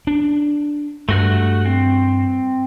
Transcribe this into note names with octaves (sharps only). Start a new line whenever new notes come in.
D4
G2 A3 F#4 F#6
C4